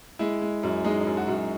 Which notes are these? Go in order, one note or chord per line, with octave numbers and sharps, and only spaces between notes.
G#3 E4
G#3
F#2
G#3 D#4
D#4
F#2
F#4
F#2
F#4